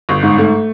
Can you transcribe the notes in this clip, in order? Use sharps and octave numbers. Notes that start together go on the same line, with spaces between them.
G1
G#2
A3